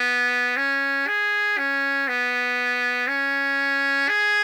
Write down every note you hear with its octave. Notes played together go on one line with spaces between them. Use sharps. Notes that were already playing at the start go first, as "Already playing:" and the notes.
Already playing: B3
C#4
G#4
C#4
B3
C#4
G#4